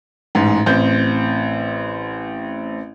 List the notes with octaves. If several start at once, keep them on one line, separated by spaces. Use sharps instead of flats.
A1 G#2
A1 C4 G6